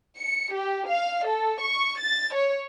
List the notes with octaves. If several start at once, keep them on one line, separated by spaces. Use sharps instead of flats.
C#7
G4
F5
A4
C#6
A6
C#5